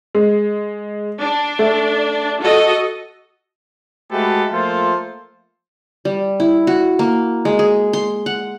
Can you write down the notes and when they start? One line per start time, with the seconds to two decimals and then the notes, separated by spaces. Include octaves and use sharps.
0.15 G#3
1.20 D4
1.59 A3
2.41 F#4 A4 D#5
4.11 G#3 A3 F#4 G4 A4 B4
4.52 F3 A3 A#3 F4 A4 C5
6.05 G3
6.40 E4
6.67 F#4
6.99 A#3
7.45 G#3
7.59 G#4
7.93 C6
8.26 F#5